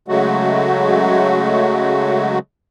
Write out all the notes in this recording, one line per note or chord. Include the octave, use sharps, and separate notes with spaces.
C#3 F#3 G#3 A3 F#4